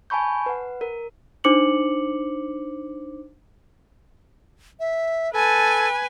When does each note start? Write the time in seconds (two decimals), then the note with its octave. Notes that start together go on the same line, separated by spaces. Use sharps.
0.10 G#5 A5 B5 C#6 G6
0.46 B4 F#5
0.81 A#4
1.44 D4 D#4 C5 D6 C#7 F#7
4.80 E5
5.33 A4 B4 G#5